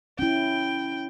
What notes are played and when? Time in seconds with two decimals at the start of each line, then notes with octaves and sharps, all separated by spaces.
0.19 C#4 E4 G5